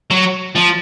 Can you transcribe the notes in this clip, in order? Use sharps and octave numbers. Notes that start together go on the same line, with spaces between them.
F#3
F3